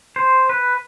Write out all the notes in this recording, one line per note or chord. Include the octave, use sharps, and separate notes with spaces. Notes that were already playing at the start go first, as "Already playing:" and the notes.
C5
B4